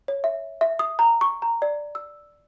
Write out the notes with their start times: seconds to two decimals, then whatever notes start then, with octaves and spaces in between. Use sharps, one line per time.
0.08 C#5
0.24 E5
0.61 E5
0.79 D#6
0.99 A#5
1.21 C#6
1.42 A#5
1.62 D5
1.95 E6